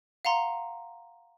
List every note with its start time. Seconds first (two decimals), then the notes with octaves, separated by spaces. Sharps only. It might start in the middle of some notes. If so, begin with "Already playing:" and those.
0.25 F5 F#5 A#5 C6